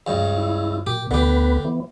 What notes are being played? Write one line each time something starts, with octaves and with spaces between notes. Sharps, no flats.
C#2 G2
E4
A#2 G4
D2 D3 B3 G4 B4
E3 B3